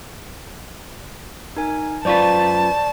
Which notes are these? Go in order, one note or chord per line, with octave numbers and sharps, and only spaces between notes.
D#4 A#4 G#5
F#2 F4 B4 C5 D5 A5 C#6